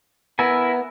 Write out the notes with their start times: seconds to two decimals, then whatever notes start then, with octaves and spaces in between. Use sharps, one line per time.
0.39 B3 E4 A#4 G#5